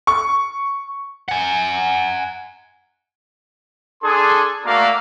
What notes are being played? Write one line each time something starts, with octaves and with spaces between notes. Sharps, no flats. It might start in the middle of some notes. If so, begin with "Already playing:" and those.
C#6
F#5 G#5
D4 G#4 A4 G#5 C6
A3 A#3 F#4 A#4 D5 F5